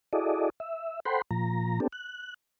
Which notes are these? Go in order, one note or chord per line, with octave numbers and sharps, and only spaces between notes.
E4 F#4 G#4 A4 D5 D#5
E5
A4 C5 F#5 G5 B5 C6
A#2 F3 A#5
B3 C4 D4 G4 A4
F#6